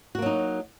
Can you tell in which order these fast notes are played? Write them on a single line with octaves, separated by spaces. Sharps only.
F#4 A#3 F#3 D#4